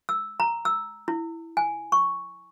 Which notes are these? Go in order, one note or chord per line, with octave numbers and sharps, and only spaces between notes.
E6
A#5
E6
E4
G#5
C#6